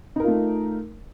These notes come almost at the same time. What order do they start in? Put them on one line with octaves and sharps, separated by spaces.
D#4 A#4 F4 A3